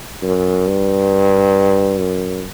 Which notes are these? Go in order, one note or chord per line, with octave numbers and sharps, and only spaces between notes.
F#2
G2
F#2